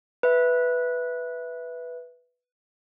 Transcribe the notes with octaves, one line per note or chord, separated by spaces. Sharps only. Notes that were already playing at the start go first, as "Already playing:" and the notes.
B4 E5